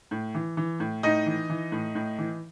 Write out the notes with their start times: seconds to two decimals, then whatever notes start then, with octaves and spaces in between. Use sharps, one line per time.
0.11 A2
0.35 E3
0.57 E3
0.80 A2
1.03 A2 D#4 D#5
1.26 E3
1.49 E3
1.72 A2
1.95 A2
2.18 E3